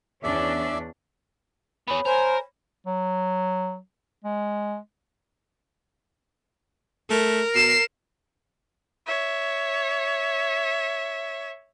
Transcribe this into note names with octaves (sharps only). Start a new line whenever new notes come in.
E2 C#4 D4 D5 E5
B3 G#4 C#5 B5
A#4 C5 G#5
F#3
G#3
A3 A#4
B2 C7 E7
C#5 E5